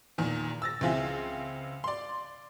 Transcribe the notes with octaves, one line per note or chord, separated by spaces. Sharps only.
E2 A#2 D#3
E6 A6 A#6
C#2 E3 C4 F4 G#4 E5
D5 C6